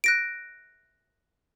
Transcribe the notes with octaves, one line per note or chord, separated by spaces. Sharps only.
F#6 A#6 D7